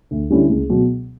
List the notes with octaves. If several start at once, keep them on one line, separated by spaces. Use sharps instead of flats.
D2
D3 G3 C#4 E4
C#2
B2 F#3